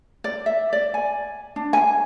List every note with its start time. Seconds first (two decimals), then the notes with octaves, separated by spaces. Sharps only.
0.24 D5
0.46 E5
0.73 D5
0.94 G#5
1.56 D4
1.73 G#5